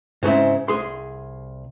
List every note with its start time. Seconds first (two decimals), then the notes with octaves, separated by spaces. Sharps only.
0.23 G#2 C#3 C4 E4
0.68 C2 G#4 C6